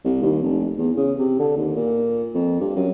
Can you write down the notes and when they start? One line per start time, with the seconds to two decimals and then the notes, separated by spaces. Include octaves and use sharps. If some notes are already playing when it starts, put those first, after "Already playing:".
0.05 C2
0.22 D#2
0.42 F1
0.77 E2
0.97 C#3
1.19 C3
1.39 D3
1.56 D#2
1.76 A#2
2.34 F2
2.60 G2
2.76 F#2